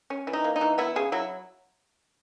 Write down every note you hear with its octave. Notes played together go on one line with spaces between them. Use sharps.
C#4
E3
D#4
A#3
D#4
E3
B3 E4
C#3 G#4
F#3 E4